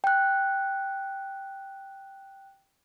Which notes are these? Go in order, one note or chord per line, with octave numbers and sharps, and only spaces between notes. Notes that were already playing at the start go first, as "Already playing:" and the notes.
G5 F#6